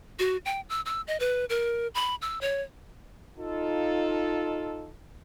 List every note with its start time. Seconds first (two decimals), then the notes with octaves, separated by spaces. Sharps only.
0.19 F#4
0.45 G5
0.69 E6
0.86 E6
1.07 D#5
1.20 B4
1.50 A#4
1.95 B5
2.22 E6
2.41 C#5
3.38 D#4 F4 A4